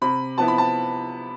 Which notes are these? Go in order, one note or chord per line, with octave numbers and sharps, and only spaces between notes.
C3 B5
F3 B3 E4 A5
B5
A5